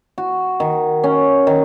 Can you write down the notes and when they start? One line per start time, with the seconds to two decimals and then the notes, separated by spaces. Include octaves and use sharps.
0.18 F#4
0.60 D#3
1.04 C#4
1.47 D#3